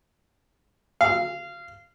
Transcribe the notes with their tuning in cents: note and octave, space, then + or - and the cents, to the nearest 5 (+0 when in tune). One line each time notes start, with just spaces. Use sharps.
F5 -20